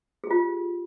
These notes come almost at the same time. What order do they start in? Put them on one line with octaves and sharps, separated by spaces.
G#4 G4 F4